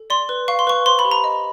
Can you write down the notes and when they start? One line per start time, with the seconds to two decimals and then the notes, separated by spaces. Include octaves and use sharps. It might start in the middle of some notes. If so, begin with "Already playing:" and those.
Already playing: A4
0.10 D5 C6
0.29 B4
0.48 F5 C#6
0.59 C6
0.67 B4 C#6
0.86 C5 C6
0.99 B5
1.05 G4
1.11 A#5
1.24 D#5